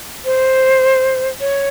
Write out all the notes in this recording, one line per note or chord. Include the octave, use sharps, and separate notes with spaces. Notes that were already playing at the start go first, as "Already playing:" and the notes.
C5
C#5